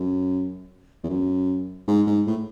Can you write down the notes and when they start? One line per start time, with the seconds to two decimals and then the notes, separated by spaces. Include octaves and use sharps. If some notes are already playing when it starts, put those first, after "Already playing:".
Already playing: F#2
1.03 E2
1.09 F#2
1.87 G#2
2.07 G#2
2.26 A2